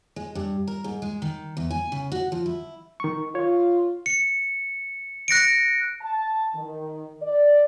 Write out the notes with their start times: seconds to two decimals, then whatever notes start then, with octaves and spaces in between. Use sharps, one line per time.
0.16 G#3
0.35 G2
0.67 A#4
0.84 G#2
1.02 G#3
1.22 D#3
1.57 E2
1.71 G#5
1.92 C#3
2.12 F#4
2.32 F3
2.46 E4
3.00 D#3 C#6
3.35 F4 C#5
4.06 C#7
5.28 F#6 A#6 C#7 D7
6.01 A5
6.55 D#3
7.21 D5